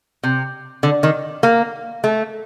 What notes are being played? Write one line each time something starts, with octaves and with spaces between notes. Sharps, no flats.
C3
D3
D#3
A#3
A3